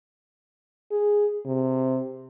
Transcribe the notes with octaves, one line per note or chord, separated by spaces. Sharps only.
G#4
C3